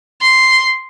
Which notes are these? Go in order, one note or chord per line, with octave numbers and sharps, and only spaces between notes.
C6